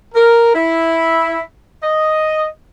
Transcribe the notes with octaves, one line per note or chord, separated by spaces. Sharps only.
A#4
E4
D#5